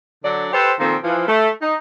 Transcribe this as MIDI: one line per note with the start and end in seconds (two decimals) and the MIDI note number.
0.24 0.48 50
0.24 0.48 54
0.24 0.48 74
0.53 0.72 67
0.53 0.72 69
0.53 0.72 71
0.53 0.72 72
0.79 0.95 46
0.79 0.95 51
0.79 0.95 53
0.79 0.95 58
0.79 0.95 60
0.79 0.95 69
1.03 1.26 52
1.03 1.26 53
1.28 1.49 57
1.62 1.74 63